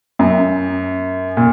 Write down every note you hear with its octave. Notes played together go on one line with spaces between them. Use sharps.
F#2
A#2